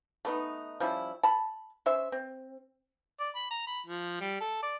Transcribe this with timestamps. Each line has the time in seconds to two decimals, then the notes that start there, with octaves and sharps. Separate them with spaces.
0.25 A3 B3 D#4
0.80 F3 G3 C#4 E4
1.23 A5 B5
1.86 C#4 C5 E5
2.12 C4
3.20 D5
3.36 B5
3.51 A#5
3.67 B5
3.86 F3
4.21 G3
4.41 A4
4.63 D5